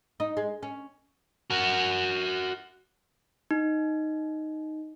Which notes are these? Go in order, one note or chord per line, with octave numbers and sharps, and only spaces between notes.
D#4
G#3
C#4
F#4 A#4
D#4